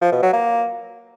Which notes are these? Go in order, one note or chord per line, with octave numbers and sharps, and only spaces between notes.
F3
B2
F#3
A#3